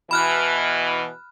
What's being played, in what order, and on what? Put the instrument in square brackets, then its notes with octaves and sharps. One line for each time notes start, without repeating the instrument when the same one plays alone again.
[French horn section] B2 E3 [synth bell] B5 F6 F#6